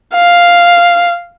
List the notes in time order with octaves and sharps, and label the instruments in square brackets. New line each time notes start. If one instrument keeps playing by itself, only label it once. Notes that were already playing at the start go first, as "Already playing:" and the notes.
[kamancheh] F5